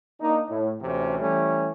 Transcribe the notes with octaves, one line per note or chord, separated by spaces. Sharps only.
A#3 D4 D#4
A2
D2 C3 E3 C#4
E3 G3 A3 C#4